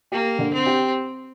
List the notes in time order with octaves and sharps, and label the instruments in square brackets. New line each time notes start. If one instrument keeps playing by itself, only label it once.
[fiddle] A#3 [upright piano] G4
[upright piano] D3
[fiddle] C4
[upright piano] G4